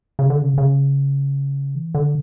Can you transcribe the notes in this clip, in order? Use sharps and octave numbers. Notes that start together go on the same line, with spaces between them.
C#3
D3
C#3
C#3
E3
D3